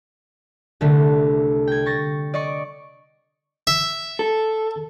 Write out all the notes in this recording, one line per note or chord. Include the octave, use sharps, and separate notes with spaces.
C2 D3 A3
G5 G#6
C#6 A6 A#6
D5 D#5 C#6 C#7
E5
A4